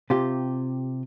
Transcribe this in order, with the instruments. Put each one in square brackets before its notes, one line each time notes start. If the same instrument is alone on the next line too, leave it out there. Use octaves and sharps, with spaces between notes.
[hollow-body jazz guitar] C3 F4 G4